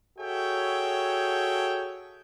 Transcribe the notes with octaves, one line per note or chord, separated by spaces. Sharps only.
F#4 G#4 A4 C#5 E5 G5